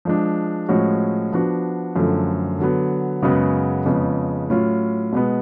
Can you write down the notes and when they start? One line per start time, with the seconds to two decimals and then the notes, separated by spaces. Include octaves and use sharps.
0.05 F3 G#3 D4
0.69 A2 F3 G#3 C#4 F#4
1.32 F3 B3 D4 F#4
1.96 F#2 D3 F3 A3 F4
2.59 D3 F#3 B3
3.23 F#2 C#3 G#3 B3 F#4
3.86 F2 C#3 G#3 B3
4.50 A2 F#3 C#4 F4
5.12 B2 G#3 B3